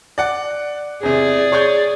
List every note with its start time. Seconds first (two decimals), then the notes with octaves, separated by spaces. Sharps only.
0.18 D5 F#5
1.03 E2 C3 G#4 D5
1.52 C#5 C#6 G6